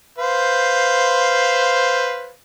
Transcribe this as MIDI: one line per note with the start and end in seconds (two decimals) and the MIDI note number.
0.18 2.31 71
0.18 2.31 72
0.18 2.31 77